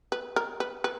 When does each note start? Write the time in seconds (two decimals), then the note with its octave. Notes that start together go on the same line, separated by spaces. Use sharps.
0.12 B4
0.36 A#4
0.60 B4
0.84 B4